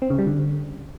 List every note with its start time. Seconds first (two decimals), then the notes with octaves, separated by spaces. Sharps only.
0.02 C4
0.10 C#3
0.18 G3
0.27 D3